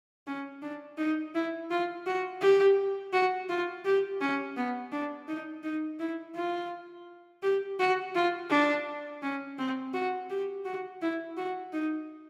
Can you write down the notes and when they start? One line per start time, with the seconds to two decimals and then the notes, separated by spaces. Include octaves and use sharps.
0.27 C#4
0.62 D4
0.98 D#4
1.35 E4
1.71 F4
2.07 F#4
2.41 G4
3.13 F#4
3.49 F4
3.85 G4
4.21 C#4
4.57 B3
4.92 D4
5.28 D#4
5.63 D#4
6.00 E4
6.36 F4
7.43 G4
7.79 F#4
8.15 F4
8.50 D4
9.23 C#4
9.59 C4
9.93 F#4
10.30 G4
10.65 F#4
11.02 E4
11.37 F#4
11.73 D#4